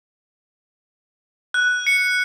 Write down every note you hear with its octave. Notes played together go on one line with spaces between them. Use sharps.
F#6
C#7